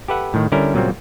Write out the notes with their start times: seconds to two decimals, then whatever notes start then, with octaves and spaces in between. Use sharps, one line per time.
0.08 G4 A4 B4 E5 F#5
0.34 A2 D#3
0.52 D3 G3 C#4 E4 A#4
0.74 A#2 C#3 F#3 G3 A#3 C4